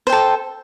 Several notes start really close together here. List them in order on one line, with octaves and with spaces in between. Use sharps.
C5 G5 A4